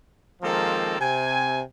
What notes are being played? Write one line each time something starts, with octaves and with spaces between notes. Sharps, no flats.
D#3 F3 G#3 A#3 C4 A4
C3 G#5